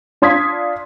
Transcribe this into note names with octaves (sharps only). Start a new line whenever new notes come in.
D4 F4 C6 D#6 G#6 B6